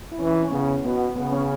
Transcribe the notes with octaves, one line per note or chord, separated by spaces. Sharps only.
E4
E3 C#4
E4
C#4
C#3 B3
B2 B3
C#3 B3
C#4